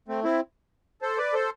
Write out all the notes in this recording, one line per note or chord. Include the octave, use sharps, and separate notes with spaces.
A3 C4
C4 E4
A4 C5
B4 D5
A4 C5